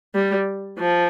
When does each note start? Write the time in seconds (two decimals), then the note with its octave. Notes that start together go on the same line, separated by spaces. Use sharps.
0.14 G3
0.79 F3